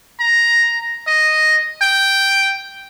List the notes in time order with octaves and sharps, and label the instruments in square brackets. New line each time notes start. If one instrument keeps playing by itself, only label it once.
[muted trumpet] A#5
D#5
G5